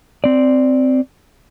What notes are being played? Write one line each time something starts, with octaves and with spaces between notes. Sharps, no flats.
C4 D5